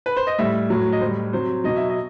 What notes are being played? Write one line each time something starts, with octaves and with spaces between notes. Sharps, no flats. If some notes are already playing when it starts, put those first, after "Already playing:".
B4
C5
D#5
A2 G3 E5
A2 F#3
D#5
A2 G3 C5
C3 F#3 C5
B2 F#3 D#5
E5
D#5